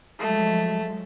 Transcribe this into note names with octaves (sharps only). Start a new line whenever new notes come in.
F3 F#3 G#3 A3